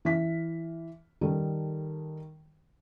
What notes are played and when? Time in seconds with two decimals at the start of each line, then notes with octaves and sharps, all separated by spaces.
0.05 E3 B6
1.21 D#3 G3 D#4 A4